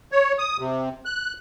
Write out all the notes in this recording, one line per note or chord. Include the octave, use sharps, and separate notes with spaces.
C#5
D#6
C3
F#6